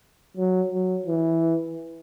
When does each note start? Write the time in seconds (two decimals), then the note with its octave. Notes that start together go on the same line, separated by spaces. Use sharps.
0.37 F#3
0.72 F#3
1.07 E3